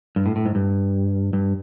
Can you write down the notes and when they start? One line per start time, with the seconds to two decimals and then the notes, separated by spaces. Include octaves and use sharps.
0.16 G2
0.26 A2
0.36 A2
0.46 G#2
0.55 G2
1.33 G2